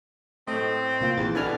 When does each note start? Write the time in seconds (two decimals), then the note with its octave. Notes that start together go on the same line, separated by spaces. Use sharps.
0.47 A2 A3 C4 D#5
1.01 C2 A#2 F4
1.17 A#1 E2 E3 A6
1.35 B2 D3 D4 E4 B4 G#5 F6